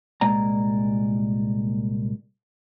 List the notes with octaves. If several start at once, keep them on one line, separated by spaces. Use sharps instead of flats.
C2 A#2 G#3 A#3 D5 A#5